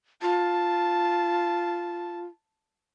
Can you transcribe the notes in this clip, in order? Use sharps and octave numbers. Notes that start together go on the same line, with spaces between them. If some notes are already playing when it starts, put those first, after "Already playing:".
F4 A5